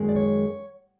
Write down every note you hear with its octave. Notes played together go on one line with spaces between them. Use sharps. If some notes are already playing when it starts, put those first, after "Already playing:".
Already playing: F#2 D#3 G#3
D5
C#5